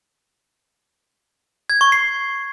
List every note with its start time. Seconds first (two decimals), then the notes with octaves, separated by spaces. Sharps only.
1.70 G#6
1.81 C#6
1.92 C7